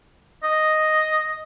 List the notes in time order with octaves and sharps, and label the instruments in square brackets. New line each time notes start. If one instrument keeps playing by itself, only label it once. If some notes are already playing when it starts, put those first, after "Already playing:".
[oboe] D#5